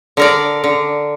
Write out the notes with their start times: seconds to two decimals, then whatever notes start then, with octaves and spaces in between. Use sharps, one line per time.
0.17 D3 A#4 D5
0.64 D3